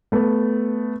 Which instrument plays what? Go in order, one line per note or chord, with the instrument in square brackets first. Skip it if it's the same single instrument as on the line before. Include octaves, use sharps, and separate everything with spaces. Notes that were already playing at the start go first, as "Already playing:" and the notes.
[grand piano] A3 B3